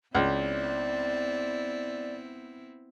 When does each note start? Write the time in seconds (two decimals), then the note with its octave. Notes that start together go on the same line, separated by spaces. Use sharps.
0.15 C#2 B3 C4 E4 D5